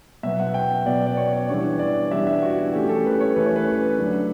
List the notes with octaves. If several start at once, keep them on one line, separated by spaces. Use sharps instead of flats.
B2 F#3 B3 E5
F#5
G5
E5
B2 F#3 B3 D5
D5
C#5
D5
E3 G3 B3 D4 C#5
D5
E3 G3 B3 D4 E5
E5
F#4
E4
E3 A3 C#4 G4
A4
B4
C#5
E3 A3 C#4 B4
C#5
B4
D3 F#3 A3 D4